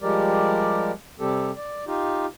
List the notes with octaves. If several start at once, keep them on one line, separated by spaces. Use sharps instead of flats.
F3 G3 G#3 G4 A#4 D5
C3 G3 C4 G4 A4
D5
D#4 F4 G4